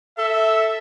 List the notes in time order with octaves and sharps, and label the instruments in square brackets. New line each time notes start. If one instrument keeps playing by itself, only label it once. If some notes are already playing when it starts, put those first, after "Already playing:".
[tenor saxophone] A4 [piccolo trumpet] E5